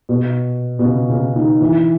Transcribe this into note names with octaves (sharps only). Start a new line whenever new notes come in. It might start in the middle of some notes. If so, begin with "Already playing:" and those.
B2
B2
C#3
C#3
D#3
E3